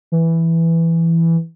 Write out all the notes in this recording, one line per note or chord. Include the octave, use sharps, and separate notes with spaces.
E3